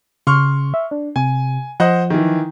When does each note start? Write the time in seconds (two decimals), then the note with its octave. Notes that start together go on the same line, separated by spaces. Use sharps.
0.27 C#3 C6 C#6 F6
0.74 E5
0.91 D4
1.16 C3 G#5
1.80 F3 C5 D#5 F#5
2.10 D#3 E3